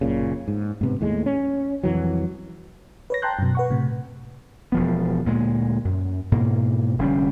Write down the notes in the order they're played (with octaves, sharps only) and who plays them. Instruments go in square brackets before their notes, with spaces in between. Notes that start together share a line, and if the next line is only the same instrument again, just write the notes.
[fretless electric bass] F#1 A#2 C#3
G#2
G#2 C3 B3
D#2 A2 G#3
C#4
C2 F2 E3 F#3
[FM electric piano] B4 C#5 A#6
G5 A5 A#5 C6 F#6 G6
F#2 B2
B4 F#5 C#6
A2 C3
[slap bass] E1 F3 B3
D2 A#2 G#3
F#2
G#2 B2 A#3
F1 D3 G3 C#4